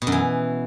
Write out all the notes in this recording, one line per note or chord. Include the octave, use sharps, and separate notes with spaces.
B2
F#2
E3